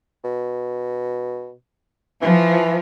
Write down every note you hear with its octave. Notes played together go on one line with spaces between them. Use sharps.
B2
E3 F3